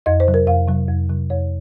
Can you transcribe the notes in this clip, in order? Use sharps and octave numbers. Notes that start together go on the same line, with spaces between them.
F2 D#5
C5
C3 F#3
A#4
F2 F5
C3 F#3
F2
C3 F#3
F2 C#5